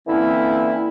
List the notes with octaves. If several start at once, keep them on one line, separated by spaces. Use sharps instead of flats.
D3 E3 A#3 C4 C#4 E4